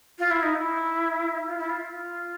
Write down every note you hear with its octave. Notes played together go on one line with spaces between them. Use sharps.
F4
E4
D#4
E4
F4
E4
F4
F4